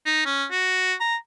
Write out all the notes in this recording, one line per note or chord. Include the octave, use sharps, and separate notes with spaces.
D#4
C#4
F#4
A#5